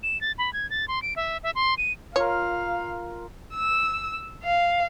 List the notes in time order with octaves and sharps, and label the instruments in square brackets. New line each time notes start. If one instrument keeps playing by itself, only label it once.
[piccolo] E7
A6
B5
G#6
A6
C6
D7
E5
E5
C6
D#7
[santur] F4 A#4 [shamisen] C#5 [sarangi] F5
[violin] E6
F5